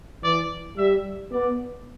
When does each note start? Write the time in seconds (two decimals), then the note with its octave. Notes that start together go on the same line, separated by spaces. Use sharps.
0.24 E3 D5
0.78 G3 E5
1.32 B3 D5